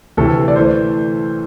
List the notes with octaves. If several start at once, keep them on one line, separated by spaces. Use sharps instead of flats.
D2 C3 E3 A4
D5
E3 A3 C5